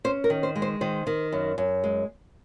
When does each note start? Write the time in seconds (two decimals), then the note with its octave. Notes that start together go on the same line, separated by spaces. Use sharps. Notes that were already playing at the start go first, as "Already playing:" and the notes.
0.04 C#4 C5
0.24 A#4
0.30 D#3
0.43 C5
0.56 G#3
0.62 C5
0.81 D#3 C5
1.07 D#3
1.32 F#2
1.58 F#2
1.84 G#3